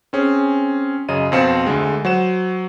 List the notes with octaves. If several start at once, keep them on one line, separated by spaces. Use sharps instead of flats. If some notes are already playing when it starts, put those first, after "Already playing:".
C4 C#4 G#4
F#2 C#3 D#5 D#7
F2 B2 C4 F5 C#7 E7
D2 D3 G#3
F#3 C5 F#5 E7